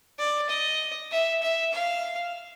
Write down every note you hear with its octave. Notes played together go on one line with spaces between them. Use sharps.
D5
D#5
E5
E5
F5